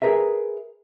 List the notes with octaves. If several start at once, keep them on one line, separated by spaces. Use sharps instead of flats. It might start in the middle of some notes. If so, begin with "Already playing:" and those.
G#4 A#4 B4 E5